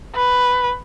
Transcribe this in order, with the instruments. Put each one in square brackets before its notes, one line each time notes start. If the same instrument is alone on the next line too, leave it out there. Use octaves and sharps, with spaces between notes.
[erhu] B4